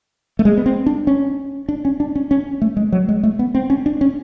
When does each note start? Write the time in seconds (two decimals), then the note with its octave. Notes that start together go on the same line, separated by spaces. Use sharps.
0.39 A3
0.45 G#3
0.57 B3
0.66 C4
0.86 D4
1.07 C#4
1.69 D4
1.85 C#4
2.00 D4
2.15 C#4
2.31 C#4
2.62 A3
2.77 G#3
2.92 F#3
3.09 G#3
3.23 A3
3.39 B3
3.55 C4
3.70 C#4
3.86 D4
4.01 C#4